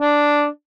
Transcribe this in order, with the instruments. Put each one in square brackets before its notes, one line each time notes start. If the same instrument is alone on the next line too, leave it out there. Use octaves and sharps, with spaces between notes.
[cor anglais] D4